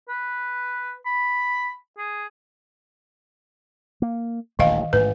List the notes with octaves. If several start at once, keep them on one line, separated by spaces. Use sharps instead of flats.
B4
B5
G#4
A#3
D#1 A1 D2 D#3 D#5 F5
A1 G#2 B4